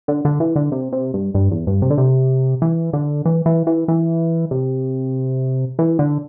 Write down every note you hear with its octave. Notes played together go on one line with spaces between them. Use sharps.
D3
D3
E3
D3
C3
C3
G2
G2
E2
G2
C3
D3
C3
E3
D3
E3
E3
E3
E3
C3
E3
D3